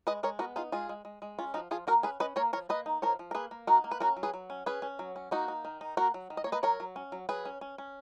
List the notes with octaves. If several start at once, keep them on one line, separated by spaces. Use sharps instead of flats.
G#3 B4 D#5
G#3 A#4 C#5
B3 F#4 A#4
D#4 F4 G#4
G#3 F4 G#4
G#3
G#3
G#3
C#4 F4
F3 D#4 F#4
F3 F4 G#4
A#3 F#4 A#4
C#4 G#4 B4
C#4 B4 D#5
A#3 A#4 C#5
F3 A#4 C#5
A#3 B4 D#5
D#4
F3 A#4 C#5
F3
A#4
A#3 G#4 B4
A#3
D#4 F#4 A#4
A#3
B4
C#4 F#4 A#4
F#3
G#4 B4
F#3
C#4
C#4 G#4 B4
C#4
F#3
C#4
A#3 D#4 F#4
D#4
D#3
D#4
A#3 F#4 A#4
F#3
D#3
D#5
A#3 C#5
B4 D#5
F#3 A#4 C#5
F#3
C#4
F#3
F#3 G#4 B4
C#4
C#4
C#4